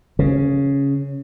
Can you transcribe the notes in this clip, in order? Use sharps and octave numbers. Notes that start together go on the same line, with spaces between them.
C#3